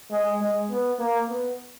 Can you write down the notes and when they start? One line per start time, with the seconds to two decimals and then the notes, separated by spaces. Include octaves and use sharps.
0.11 G#3
0.41 G#3
0.71 B3
0.99 A#3
1.29 B3